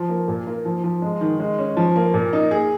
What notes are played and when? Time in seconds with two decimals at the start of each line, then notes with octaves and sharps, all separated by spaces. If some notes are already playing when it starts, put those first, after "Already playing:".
Already playing: F3
0.09 A#3
0.28 A#2
0.47 A#3
0.65 F3
0.84 F3
1.02 G#3
1.21 D#3
1.40 G#3
1.59 C#4
1.77 F3
1.96 A#3
2.14 A#2
2.33 D#4
2.51 G#4